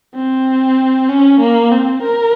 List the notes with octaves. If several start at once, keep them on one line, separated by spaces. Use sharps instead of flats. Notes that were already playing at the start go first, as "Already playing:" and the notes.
C4
C#4
A#3
C4
A#4